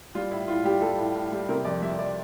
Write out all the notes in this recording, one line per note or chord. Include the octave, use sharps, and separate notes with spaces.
G3 F4
A2 E4
A2 F4
G3 G4
G3 A4
A2
A2
G3
C3 A#4
F2 D5
G3 E5
F2 D5